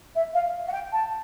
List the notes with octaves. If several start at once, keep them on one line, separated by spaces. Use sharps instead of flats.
E5
F5
F#5
G5
A5